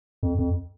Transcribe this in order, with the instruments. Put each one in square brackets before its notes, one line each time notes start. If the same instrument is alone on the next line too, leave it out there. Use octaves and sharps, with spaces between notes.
[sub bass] F2
F2